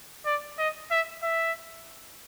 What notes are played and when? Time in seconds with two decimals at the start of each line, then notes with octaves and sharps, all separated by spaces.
0.25 D5
0.58 D#5
0.91 E5
1.23 E5